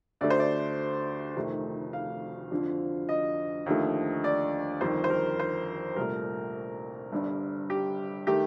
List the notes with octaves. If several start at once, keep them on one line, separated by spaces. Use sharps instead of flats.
D2 D3 A3 D5
C5
D5
F1 F2 D#3 A3
F5
F2 D3 F3
D#5
D#2 D3 F3 A3
D5
G1 F2 D#3 C5
C5
A#4
C5
C2 A#2 A3 A#4
G1 G2 D3 G3
G4
D#3 A3 G4